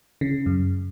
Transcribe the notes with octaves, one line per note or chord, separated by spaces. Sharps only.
C#3
F#2